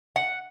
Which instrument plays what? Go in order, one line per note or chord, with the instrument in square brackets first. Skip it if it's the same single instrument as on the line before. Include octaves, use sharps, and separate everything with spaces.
[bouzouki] F#5